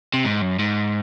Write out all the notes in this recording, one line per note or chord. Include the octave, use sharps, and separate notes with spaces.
C3
G#2
F#2
G#2